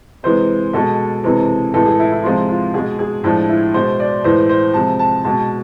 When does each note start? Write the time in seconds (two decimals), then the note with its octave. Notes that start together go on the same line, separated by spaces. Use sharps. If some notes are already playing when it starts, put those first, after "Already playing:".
0.23 C3 E3 G#3 C5
0.73 B2 G#3 A4
1.24 C3 E3 G#3
1.74 A2 E3 G#3 A4
1.86 G#4
1.99 E4
2.11 E4
2.23 C3 F3 G#3 F4
2.49 F4
2.74 B2 G#3 G#4
2.99 G#4
3.24 A2 F3 G#3 D4
3.49 E4
3.74 B2 G#3 C5
4.00 D5
4.24 A2 E3 G#3 C5
4.49 C5
4.74 C3 F3 G#3 A5
4.99 A5
5.24 B2 G#3 A5